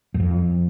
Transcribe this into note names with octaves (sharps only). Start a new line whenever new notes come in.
F#2
F2